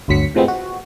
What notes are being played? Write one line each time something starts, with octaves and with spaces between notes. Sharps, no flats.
G1 D2 F#3 B6 C#7
A2 C3 F3 G#3 B3 C4
F#4